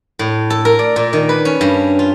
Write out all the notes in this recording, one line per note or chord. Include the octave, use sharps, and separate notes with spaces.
A2
A4
A#4
D5
A#2
D#3
B4
C#4
G2
F4